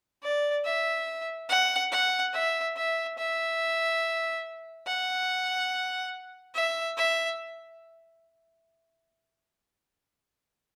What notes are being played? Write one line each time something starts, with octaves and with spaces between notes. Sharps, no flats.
D5
E5
F#5
F#5
E5
E5
E5
F#5
E5
E5